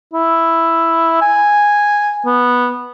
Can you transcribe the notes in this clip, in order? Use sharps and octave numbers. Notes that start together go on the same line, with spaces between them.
E4
G#5
B3